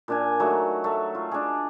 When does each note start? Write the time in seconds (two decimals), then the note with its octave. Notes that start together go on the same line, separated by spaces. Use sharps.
0.08 A#2 D4 G#5
0.40 F#3 A3 D#4
0.84 A3
1.15 F4
1.32 D4 G#4